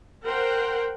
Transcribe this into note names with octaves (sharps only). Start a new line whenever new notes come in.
A#4 C5 F#5 G5